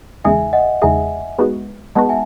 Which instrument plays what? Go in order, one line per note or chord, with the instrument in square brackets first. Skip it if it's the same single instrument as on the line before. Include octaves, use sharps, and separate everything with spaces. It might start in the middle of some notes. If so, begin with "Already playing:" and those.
[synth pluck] E2 C#3 G#3 D#4 G#4 [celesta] E5 G#5
[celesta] D#5 F#5
[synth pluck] E2 C#3 G#3 D#4 G#4 [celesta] E5 G#5
[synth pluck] G#3 B3 D#4 F#4
[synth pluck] G#3 B3 D#4 F#4 [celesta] F#5 A5
[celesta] E5 G#5